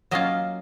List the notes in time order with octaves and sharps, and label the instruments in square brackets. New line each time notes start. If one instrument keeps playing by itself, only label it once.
[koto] F#3 A#3 C#4 F4 D#5